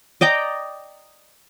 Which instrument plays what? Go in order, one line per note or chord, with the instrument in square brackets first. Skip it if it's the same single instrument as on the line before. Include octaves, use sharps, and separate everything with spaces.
[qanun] D5 D#5 G5 A#5